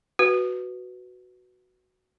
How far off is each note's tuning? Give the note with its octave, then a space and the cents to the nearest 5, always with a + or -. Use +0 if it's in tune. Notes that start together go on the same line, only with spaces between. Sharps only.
F#4 +0 B4 +0